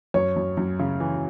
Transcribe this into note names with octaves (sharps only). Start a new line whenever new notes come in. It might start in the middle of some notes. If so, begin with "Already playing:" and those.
F#2 C#5
F#2
F#2
C#3
E3